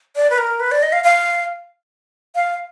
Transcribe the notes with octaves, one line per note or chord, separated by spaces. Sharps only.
D5
B4
A#4
B4
D5
D#5
F5
F5
F5